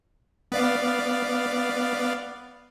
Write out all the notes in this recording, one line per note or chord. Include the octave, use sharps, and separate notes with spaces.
B3 D5 F5